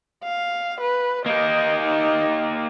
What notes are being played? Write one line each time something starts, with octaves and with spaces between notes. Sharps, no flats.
F5
B4
A#3 G4 D#5
D#4